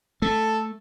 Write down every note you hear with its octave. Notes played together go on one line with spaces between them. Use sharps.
A3 A4